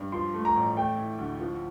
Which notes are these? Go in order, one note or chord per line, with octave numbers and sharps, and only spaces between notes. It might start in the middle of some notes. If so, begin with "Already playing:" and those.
Already playing: G2
F3 C6
A3
A#5
A1
A3 G5
E4
D2
F3